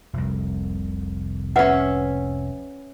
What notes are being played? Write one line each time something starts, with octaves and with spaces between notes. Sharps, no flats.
F1 C2
C#4 B4 E5 F#5